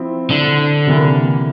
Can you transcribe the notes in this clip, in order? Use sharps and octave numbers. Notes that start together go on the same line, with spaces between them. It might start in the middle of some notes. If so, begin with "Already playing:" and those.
Already playing: F3 C4 E4
D3
C3 E3 A#3 E4